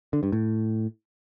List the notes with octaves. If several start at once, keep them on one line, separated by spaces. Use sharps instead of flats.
D3
G2
A2